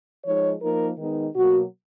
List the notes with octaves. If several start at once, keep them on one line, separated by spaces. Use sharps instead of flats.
F3 G#3 D#4 C#5
F3 A#3 D#4 A#4
D#3 G#3 B3 D#4
B2 F#3 A#3 F#4